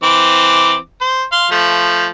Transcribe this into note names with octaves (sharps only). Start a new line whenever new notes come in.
E3 C4 D6
C5
F5 C6
F3 A3